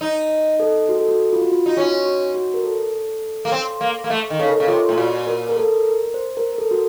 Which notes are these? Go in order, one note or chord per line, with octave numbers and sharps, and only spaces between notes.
D#4
A4
F#4
A4
F#4
F4
F#4
F4
D#4
C#4 F#4
F#4
F#4
A#4
A4
A#3
C4
A#3
A#3
A3
D#3
C#3 A4
A#4
C#3 A4
C3 F4
A2
A#2 F#4
A#4
A#4
A4
A#4
C5
A#4
A#4
A4
F#4